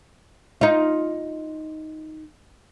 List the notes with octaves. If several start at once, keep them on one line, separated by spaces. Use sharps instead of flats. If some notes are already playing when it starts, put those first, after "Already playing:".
D#4 F4